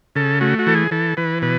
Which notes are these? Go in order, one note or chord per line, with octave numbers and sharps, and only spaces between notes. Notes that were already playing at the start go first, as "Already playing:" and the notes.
C#3 A4
A3 F#4
F#4
E3 A4
G#4
E3 A4
E3 B4
B2 B4